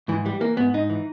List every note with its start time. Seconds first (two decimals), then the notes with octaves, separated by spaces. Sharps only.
0.08 G#2 E3
0.25 E3 G3
0.40 E3 A#3
0.57 G#2 B3
0.74 G#2 D#4
0.90 E3